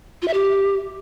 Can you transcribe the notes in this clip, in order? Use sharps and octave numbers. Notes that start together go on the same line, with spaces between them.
F4
E5
G4